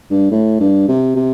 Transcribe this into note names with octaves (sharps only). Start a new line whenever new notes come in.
G2
A2
G2
C3
C3